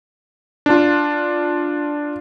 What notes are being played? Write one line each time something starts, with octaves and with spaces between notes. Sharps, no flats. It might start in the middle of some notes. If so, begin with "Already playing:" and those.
D4 F4